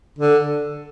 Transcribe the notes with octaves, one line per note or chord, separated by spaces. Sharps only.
D3